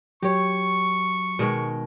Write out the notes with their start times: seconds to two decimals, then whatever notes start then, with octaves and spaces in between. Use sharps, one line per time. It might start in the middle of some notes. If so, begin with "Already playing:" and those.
0.23 F#3 G4 C#5 C#6
1.39 B2 D#3 G#3